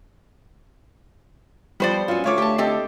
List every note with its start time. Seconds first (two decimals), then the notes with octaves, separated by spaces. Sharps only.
1.80 F3 G3 B3 C5 D5
2.08 F#3 C#4 F4
2.24 D2 A3 F4 C#5 D6
2.38 G4 A5
2.58 C4 G4 A4 D#5